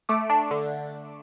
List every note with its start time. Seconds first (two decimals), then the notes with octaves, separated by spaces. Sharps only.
0.09 A3 D6
0.30 D4
0.51 D3